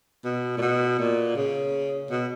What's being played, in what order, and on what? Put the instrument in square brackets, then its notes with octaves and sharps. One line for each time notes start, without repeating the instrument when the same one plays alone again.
[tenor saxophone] B2
A#2
B2
A#2
C#3
B2